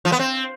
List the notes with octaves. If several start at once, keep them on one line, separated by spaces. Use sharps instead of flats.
F3
B3
C4